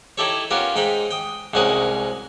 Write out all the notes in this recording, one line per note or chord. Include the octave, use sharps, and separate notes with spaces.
D#4 E4 G4 A4 C#5
B3 C#4 F4 G4 A#4
G#2 D#4 G5 A#5 B5
G5 D#6
C2 G#2 C#4 F#4 A#4 D#6